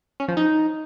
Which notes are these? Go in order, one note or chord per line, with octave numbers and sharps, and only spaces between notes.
C#4
F3
D#4